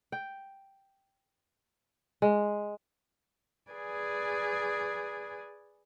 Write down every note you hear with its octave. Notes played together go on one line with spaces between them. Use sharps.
G5
G#3
G#4 B4 D5 G#5